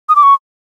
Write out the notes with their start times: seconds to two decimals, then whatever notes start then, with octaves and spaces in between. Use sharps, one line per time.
0.09 D#6
0.16 D6
0.23 C#6